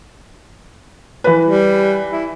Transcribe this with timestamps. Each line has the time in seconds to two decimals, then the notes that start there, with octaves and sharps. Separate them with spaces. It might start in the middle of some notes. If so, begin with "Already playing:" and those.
1.24 E3 B4
1.45 G3
2.11 E4